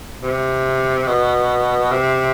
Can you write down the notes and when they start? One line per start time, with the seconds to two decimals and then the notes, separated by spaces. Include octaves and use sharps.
0.23 C3
1.07 B2
1.91 C3